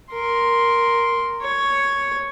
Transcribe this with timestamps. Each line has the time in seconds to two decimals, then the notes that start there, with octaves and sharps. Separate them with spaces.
0.13 A#4 C6
1.42 C#5